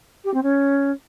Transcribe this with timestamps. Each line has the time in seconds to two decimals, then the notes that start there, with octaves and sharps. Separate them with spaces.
0.25 G4
0.34 C4
0.43 C#4